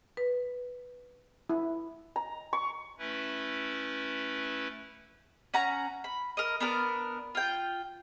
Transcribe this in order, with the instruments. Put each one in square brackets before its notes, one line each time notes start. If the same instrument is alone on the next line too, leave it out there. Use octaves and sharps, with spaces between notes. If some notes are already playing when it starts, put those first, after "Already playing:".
[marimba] B4
[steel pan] E4
[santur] A#5
C#6
[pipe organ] A3 C#4 E4 B4
[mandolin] C#4 F#5 A#5
B5
A#4 D#5
B3 D4 A#4
F4 G5